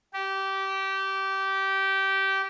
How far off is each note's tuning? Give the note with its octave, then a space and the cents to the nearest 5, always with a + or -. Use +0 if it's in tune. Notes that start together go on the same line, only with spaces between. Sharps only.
G4 -20